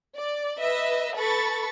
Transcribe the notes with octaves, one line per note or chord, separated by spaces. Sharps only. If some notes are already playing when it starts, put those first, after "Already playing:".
D5
B4 D#5 E5
A4 B4 B5 C#6 A6